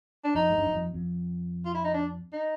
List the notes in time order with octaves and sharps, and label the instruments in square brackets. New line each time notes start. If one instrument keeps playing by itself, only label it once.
[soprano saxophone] D4
[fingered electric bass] F2 [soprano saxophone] D#4
[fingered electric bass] G#2
G2
F#2
F2
F2
[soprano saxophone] F4
E4
D#4
D4
D#4